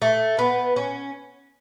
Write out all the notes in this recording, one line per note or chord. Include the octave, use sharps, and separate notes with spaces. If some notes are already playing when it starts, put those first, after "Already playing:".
A3
B3
C#4